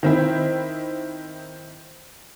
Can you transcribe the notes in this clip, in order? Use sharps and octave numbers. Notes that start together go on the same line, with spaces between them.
D#3 C4 E4